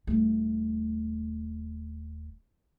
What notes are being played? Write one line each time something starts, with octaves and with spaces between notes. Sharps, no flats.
D#1 A3